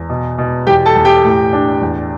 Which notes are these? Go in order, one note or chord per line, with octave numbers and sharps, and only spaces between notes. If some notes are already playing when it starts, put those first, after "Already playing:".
Already playing: E2
B2
B2
E2 G4 G5
A4 A5
E2
G4 G5
A2
D4
E2